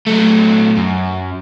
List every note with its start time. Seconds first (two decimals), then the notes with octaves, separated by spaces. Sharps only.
0.07 F#3 A3
0.77 F#2